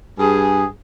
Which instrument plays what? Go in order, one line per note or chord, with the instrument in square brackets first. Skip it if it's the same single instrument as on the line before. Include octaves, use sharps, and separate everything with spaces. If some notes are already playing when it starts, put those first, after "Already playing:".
[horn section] G2 G#4